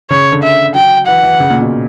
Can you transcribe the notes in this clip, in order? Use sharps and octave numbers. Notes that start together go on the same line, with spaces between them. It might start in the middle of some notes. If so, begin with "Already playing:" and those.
C#3 C#5
D3
E5
F#3 G5
E3 F#5
E3
C#3
A#2
B2